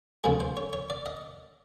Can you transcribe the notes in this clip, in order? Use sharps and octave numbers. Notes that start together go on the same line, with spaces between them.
D2 C3 F3 G#3 G#4
C5
C#5
C#5
D5
D#5